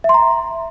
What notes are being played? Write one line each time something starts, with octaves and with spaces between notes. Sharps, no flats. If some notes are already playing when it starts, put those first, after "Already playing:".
E5
C6
A#5